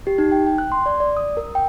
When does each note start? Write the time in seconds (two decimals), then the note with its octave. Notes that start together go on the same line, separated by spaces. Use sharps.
0.07 G4
0.18 D#4
0.32 G5
0.47 G5
0.58 F#6
0.72 C6
0.86 D5
1.00 D5
1.17 D#6
1.37 A#4
1.55 G5